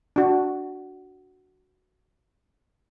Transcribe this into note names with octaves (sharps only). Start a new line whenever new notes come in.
D4 F#4